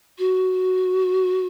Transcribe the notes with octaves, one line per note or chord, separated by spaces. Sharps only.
F#4